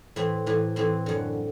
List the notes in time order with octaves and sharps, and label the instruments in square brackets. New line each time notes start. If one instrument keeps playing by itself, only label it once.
[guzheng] A2 E3 C4
A2 E3
A2 E3 C4
F#2 D3